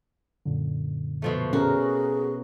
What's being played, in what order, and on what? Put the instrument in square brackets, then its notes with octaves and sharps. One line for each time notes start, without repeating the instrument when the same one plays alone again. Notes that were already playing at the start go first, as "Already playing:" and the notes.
[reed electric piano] F#2 A#2 D3
[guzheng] B2 F3 A3
[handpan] C#4 A#4 [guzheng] F#4 [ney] G#4